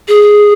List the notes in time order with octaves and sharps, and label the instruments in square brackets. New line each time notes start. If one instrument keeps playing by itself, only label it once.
[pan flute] G#4